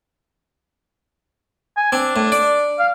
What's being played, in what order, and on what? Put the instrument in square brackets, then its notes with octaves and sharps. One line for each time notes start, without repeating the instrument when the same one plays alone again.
[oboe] G#5
[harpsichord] C4 [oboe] D4
[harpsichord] A2
D5
[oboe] F5